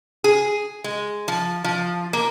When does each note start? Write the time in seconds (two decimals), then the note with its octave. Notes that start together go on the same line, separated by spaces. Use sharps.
0.24 G#4
0.84 G#3
1.28 F3
1.64 F3
2.13 A#3